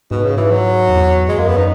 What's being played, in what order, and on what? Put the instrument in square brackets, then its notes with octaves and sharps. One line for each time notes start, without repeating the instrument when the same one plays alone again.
[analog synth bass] G#2 [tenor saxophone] B2
[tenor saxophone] C#3
E3
F#3
[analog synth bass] E2
[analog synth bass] F#2 [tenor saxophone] G#3
[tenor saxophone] A#3
B3
D#4